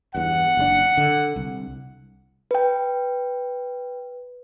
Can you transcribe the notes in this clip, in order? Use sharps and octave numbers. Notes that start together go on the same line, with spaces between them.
E2 G2 F#5
F#1 A2 D4
D3
C2
B4 G5